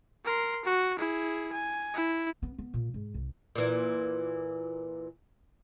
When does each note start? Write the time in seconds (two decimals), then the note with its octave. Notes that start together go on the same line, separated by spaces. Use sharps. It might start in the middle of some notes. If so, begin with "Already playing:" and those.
0.25 A#4 C6
0.65 F#4
0.98 E4 G#4
1.52 G#5
1.93 E4
2.43 B3
2.58 B3
2.74 A#2
2.94 G#2
3.14 C2
3.55 A#2 E3